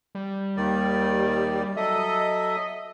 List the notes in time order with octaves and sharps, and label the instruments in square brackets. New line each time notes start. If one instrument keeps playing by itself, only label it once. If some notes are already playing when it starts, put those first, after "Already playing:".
[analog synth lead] G3
[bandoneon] D#2 D#3 D5
[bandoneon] F#3 A4 E5 [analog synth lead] D#5